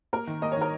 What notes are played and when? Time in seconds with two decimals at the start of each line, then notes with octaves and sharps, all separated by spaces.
0.13 A#3 A#4
0.27 D#3
0.42 A#3 D#5
0.52 C#5
0.57 D#3 A#4